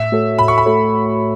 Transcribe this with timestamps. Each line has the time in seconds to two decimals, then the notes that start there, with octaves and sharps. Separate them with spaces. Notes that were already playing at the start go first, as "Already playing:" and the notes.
Already playing: A2 E5
0.12 A3 F#4 A4 C#5
0.39 A2 B5
0.48 C#6
0.58 B5
0.66 A3 F#4 A4 C#5